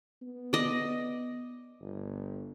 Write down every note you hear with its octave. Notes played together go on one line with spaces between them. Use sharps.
B3
D5 D#5
G1